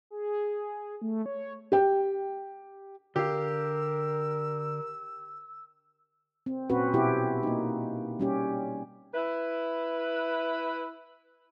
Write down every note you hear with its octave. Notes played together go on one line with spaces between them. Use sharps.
G#4
A3
C#5
G4 G5
D3 G4 A#4 F5 E6
C4
A#2 C4 C#4 F#4 B4
B2 E4 G4
A#3 D#4
G3 C#4 G4
E4 B4